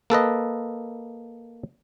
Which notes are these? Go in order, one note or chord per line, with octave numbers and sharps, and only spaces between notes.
A#3 A4 B4 D#5